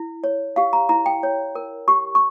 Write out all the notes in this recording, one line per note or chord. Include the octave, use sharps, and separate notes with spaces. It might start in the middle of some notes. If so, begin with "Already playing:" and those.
Already playing: E4
C#5
G4 F5
A#5
E4 A#5
G5
C#5
A#4
G4 C#6
C#6